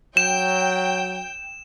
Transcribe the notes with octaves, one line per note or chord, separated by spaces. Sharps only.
F#3 G5 E7